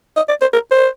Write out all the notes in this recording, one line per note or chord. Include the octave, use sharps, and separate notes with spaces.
D#5
D5
C5
A#4
C5